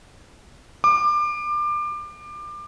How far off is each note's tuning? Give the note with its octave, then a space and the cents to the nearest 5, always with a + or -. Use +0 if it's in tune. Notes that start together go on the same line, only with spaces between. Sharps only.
D6 +25